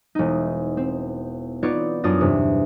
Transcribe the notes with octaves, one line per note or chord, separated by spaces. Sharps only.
E1 D#4
C4
B3 D#4 F4 C#5 D5
F#2 D4 F4 D#6 A6
E2 G2 C3